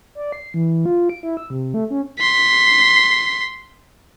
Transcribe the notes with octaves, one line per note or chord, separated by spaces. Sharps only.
D5
C7
E3
F4
D7
E4
E6
C3
A3
C#4
C6 B6